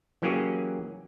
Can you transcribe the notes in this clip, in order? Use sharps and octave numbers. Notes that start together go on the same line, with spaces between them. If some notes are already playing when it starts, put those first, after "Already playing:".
E3 F#3 A#3 C#4 G4 G#4